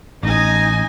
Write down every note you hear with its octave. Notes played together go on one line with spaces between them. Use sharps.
A1 D#4 D#5 G#5